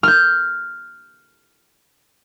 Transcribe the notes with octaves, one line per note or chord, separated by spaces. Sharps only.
F6 G6